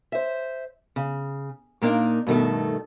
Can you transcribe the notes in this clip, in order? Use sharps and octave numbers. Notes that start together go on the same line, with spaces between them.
C5 E5
C#3
A#2 A#3 D4 D#4
G2 B2 D#3 A3 A4